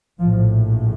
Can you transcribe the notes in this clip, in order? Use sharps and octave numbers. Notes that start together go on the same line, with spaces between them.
A#1 A2 F3